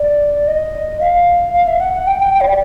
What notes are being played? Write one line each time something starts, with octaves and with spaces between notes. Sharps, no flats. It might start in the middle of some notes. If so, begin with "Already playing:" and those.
Already playing: D5
D#5
F5
F5
E5
F#5
F#5
G5
G5
G5
C#5
D5